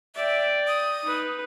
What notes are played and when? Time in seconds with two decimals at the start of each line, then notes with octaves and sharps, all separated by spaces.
0.15 D5 E5 G5
0.67 D#6
1.03 D#4 B4